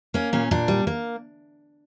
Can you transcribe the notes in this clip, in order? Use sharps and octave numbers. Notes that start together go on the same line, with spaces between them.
A#3 C#4
A#2 C#4
A#2 D4
G3
A#3